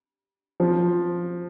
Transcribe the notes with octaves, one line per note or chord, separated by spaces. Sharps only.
F3